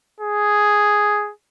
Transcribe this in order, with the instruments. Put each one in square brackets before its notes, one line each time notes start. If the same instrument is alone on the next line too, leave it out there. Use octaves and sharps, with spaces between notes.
[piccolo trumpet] G#4